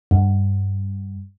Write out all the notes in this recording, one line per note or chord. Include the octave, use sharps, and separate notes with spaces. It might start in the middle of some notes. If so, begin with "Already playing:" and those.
G2